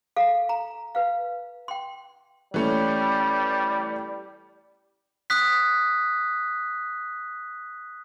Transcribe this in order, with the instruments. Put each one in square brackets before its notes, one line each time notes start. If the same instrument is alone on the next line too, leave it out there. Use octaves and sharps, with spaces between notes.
[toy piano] A4 F5
A#5
B4 F5
G5 C6
[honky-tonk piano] E3 A3 C#4 [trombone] G3
[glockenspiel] D#6 F#6 B6